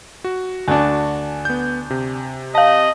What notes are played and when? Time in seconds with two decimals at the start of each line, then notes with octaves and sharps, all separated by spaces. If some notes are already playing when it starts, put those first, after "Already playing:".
0.24 F#4
0.68 D2 D4 G#5
1.45 B3 G6
1.90 C3
2.55 D#5 F5 A5